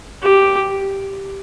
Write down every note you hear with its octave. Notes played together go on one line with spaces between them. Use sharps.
G4